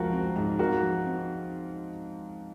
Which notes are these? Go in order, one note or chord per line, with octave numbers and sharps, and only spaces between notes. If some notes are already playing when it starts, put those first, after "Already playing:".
Already playing: C#2 F3 F4 F#4 A#4
C4
G#2
F4 F#4 A#4
F3
C4